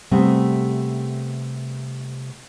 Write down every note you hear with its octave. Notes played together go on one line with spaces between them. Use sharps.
C3 G3 A3 B3 G4 G#4